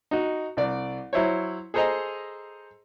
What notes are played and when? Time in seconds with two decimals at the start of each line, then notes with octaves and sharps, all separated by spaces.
0.11 D#4 F#4
0.57 C2 D5
1.13 F#3 E4 C5 C#5
1.74 G#4 A4 C5 D#5 A#5